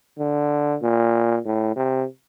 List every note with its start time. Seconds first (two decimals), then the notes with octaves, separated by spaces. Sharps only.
0.19 D3
0.82 A#2
1.45 A2
1.76 C3